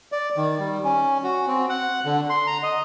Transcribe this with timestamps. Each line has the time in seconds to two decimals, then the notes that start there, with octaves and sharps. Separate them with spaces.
0.12 D5
0.37 D#3
0.59 G3
0.84 C#4
1.24 F#4
1.48 C4
1.69 F#5
2.05 D3
2.30 C6
2.47 A#5
2.63 D#5